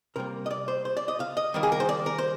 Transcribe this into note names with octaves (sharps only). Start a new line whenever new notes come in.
C3 G3 A#3 A#4
D#5
D5
C5
C5
D5
D#5
F5
D#5
D#3 G3 A#3
G#4
A#4
C5
D5
A#4
C5